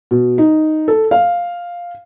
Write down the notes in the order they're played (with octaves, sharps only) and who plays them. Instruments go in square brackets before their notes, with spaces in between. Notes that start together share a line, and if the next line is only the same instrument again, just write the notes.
[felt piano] B2
D#4
A4
F5